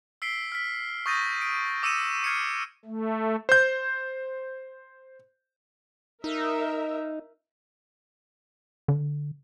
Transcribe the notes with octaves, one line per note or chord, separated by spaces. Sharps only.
E6 B6 C7 D7 G7
F6 B6
C#6 D#6 G6 A6 A#6 D#7
D7
D6 E6 C#7 D#7 E7
F6 G#6 C7 C#7 E7
A3
C5 G6
D#4 A#4 E5
D3